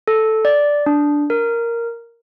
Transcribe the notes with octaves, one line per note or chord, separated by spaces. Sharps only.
A4
D5
D4
A#4